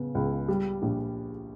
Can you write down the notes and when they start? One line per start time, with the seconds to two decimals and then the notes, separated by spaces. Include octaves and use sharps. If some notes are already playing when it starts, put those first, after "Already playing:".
Already playing: C#3 B3
0.15 C#2
0.48 G3
0.82 A#1